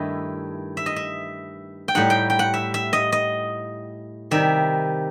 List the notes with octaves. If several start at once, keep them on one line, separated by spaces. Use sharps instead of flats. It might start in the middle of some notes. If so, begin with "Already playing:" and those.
Already playing: G2 D#3 A3 E4 D#5
E5
D#5
E5
G5
A2 G3 D#4 F#5
G5
G5
F#5
E5
E5
D#5
D#5
C3 D#3 G3 E5